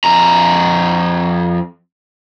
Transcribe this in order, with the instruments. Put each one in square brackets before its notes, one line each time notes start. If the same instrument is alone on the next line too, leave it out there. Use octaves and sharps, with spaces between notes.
[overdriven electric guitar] F2 A#5